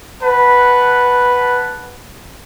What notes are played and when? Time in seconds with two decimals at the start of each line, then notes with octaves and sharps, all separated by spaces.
0.22 B4 F#5 A5